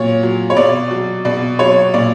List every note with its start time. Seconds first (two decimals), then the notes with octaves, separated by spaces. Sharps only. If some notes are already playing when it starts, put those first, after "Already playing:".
Already playing: A#2 F#3 C#5
0.23 F#3
0.50 C#5
0.57 B2 D5
0.91 F#3
1.25 B2 D5
1.59 F#3 C#5
1.94 A#2 D5